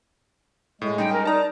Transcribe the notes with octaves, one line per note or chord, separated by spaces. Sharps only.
A2 G#3
G3 C#4 D#4 G5
A#4
D#4 D5 A5 A#5